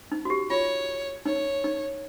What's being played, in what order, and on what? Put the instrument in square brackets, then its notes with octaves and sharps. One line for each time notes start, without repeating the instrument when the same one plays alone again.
[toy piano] D#4
F#4
G4
[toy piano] F4 [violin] C#5
[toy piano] D#4 [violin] C#5
[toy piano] D#4